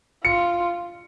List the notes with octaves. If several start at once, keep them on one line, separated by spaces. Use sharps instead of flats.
F4 C#7